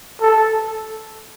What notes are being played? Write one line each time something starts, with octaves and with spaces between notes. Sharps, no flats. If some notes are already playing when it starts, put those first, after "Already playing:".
A4